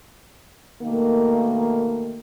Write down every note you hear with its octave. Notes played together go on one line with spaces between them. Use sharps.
B2 D#3 A3 A#3